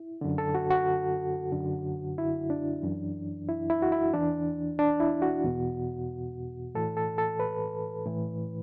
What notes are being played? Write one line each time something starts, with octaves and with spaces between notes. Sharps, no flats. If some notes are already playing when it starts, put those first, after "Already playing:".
Already playing: E4
F#2 D3
A4
F#4
F#4
F#2 D3
E4
D4
F#2 E3
E4
E4
F#4
E4
E2 E3 D4
D4
E4
F#4
E2 B2
A2 E3 A4
A4
A4
B4
A2 E3